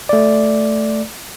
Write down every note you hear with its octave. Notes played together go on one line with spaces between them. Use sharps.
A3 D5